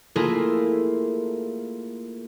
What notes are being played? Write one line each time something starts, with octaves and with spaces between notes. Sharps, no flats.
A3 A#3 E4 F4 G#4